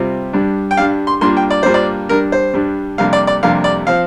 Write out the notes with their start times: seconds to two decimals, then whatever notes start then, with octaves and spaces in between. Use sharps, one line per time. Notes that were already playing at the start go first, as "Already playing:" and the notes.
Already playing: C3 G3 C4 F4
0.33 G2 G3 D4
0.71 G5
0.77 G2 G3 D4 F5
1.07 C6
1.21 G2 G3 A#3 D4 F4 C6
1.37 G5
1.51 D5
1.63 G2 G3 A#3 D4 F4 C5
1.74 D5
2.09 G2 G3 D4 A#4
2.32 C5
2.53 G2 G3 D4
2.98 F2 C3 G3 A#3 D4 F5
3.13 D5
3.27 D5
3.43 F2 C3 G3 A#3 D4 F5
3.64 D5
3.87 F3 C4 F5